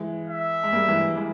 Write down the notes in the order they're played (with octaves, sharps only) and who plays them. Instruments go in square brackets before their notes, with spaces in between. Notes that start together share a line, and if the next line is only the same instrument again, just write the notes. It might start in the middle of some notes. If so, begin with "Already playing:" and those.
Already playing: [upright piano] E3 G#3
[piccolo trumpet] E5
[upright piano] G#3
G3 A#3
E3 G#3
E3 G#3